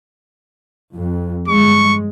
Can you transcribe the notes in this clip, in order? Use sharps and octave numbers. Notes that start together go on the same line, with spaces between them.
F2
G1 G#3 C#6